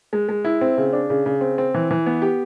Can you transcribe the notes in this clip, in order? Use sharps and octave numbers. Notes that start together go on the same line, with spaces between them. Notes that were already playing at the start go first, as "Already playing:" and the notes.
G#3
G#3
E4
C4
C#3
D4
C#3
C#3
C4
C4
E3
E3
B3
G4